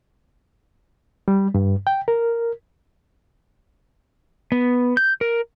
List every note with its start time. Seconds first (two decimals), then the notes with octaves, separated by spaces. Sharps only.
1.28 G3
1.54 G2
1.87 G5
2.08 A#4
4.52 B3
4.97 G6
5.21 A#4